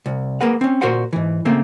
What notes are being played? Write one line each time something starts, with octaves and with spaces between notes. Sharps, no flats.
C2
A#3 G#4 A#4 B4 F#5
C4 C#4
A#2 F#4 A#4 C5 F#5 C6
G#2 E3
C#3 A3 A#3 C4